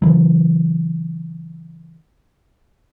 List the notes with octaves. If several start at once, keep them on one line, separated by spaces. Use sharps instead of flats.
C#3 E3 F#3